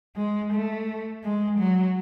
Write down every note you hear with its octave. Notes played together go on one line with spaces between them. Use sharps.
G#3
A3
G#3
F#3